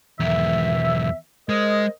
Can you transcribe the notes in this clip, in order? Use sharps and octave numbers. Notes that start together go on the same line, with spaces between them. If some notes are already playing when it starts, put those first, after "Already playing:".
B1 E2 D#3 E3 E5
G#3 A#4 C5 D#5